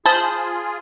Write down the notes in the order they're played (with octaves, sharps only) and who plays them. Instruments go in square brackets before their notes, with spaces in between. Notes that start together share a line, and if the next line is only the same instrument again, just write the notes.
[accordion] F4 G#4 [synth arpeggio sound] C5 B5 D#6 [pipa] A5